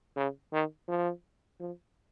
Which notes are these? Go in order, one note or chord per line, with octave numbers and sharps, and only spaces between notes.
C#3
D#3
F3
F3